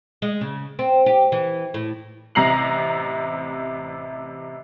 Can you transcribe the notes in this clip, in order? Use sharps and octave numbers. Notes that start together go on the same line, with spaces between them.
G#3
C#3
C4
G4
E3
A2
A1 C3 A#5 C7 F#7